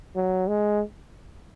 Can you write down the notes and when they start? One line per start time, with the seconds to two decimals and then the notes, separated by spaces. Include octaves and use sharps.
0.16 F#3
0.48 G#3